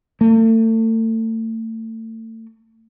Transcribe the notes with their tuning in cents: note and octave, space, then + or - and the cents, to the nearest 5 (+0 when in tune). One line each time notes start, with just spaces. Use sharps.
A3 +35